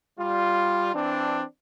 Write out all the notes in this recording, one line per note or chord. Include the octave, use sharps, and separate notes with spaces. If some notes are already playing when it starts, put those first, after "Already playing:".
G3 F4
E3 C4 D4